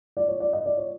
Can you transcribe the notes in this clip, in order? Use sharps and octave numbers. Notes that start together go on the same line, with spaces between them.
D5
C#5
D5
D#5
D5
C#5